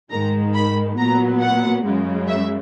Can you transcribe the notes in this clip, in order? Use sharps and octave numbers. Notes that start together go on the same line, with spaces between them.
G#2 D#3 G#3 A#5
B5
A#2 F#3 B3 A#5
F#5
F#2 C#3 G#3
E5